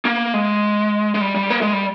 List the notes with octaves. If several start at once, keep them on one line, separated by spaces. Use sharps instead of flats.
A#3
G#3
G#3
G3
G3
A#3
G#3
G3